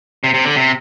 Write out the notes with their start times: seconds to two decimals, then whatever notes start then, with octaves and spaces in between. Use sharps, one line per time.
0.24 C3
0.34 C3
0.45 D3
0.56 C3